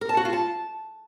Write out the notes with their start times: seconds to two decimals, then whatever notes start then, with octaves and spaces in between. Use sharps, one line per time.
0.01 A#4
0.09 A5
0.17 F#4
0.25 F4
0.33 A5